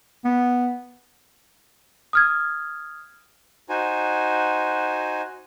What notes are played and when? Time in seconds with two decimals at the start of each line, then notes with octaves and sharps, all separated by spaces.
0.25 B3
2.13 D#6 F6 G#6
3.69 D#4 F#4 C5 G#5